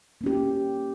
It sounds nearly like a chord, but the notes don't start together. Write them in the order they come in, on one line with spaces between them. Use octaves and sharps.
A#3 C#4 G4